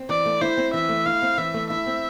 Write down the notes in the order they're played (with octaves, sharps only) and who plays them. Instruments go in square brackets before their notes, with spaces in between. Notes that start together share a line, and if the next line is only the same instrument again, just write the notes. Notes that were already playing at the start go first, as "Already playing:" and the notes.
Already playing: [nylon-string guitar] C4
[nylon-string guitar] E3 [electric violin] D5
[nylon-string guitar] A3
[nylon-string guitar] E4 [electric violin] C5
[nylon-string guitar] C4
[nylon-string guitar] E3 [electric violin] E5
[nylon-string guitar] A3
[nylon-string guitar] E4 [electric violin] F5
[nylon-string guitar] C4
[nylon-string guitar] E3 [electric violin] E5
[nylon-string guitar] A3
[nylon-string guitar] E4 [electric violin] E5
[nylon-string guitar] C4